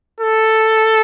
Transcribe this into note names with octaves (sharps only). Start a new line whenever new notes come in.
A4